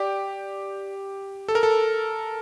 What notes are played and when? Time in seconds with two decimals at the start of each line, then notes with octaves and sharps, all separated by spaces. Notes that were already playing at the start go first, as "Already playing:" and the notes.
Already playing: G4 D5 G5
1.48 A4
1.55 A#4
1.63 A4